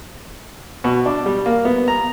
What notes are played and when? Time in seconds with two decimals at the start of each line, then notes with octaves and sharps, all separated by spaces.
0.84 B2
1.06 D4
1.26 G3
1.46 A#3
1.65 B3
1.88 A#5